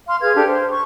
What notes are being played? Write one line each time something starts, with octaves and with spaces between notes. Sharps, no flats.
F5 C6
G#4 B4 F5 G#6
D4 G4 A4 F5
C5
C#6